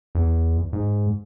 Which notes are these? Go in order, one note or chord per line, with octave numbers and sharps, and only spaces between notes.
E2
G#2